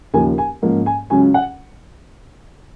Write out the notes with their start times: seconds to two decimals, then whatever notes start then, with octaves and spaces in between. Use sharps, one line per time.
0.14 D#2 C#3 F3 A#3 D#4 G#5
0.38 G#5
0.62 G#2 F3 A#3 C#4
0.86 G#5
1.10 C#2 C#3 F#3 C#4 G#5
1.34 F#5